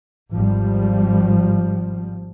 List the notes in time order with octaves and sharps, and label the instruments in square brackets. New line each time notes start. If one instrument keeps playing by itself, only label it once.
[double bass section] G#1 F3 G3